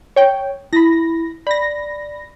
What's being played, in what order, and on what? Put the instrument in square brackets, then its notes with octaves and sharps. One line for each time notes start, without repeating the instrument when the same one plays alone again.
[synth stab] C#5 G5
[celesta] E4 [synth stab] B5 A#6
[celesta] D5 [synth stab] B5 A#6